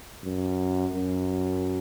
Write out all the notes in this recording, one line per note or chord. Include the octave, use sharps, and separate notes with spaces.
F#2
F#2